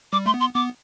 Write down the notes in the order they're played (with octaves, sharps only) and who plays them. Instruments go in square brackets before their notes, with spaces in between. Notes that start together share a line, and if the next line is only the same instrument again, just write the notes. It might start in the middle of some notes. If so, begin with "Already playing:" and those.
[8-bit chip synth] G3 [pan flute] D6
[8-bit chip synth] A3 [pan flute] C6
[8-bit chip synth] B3
[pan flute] C6
[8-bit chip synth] B3 [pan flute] D6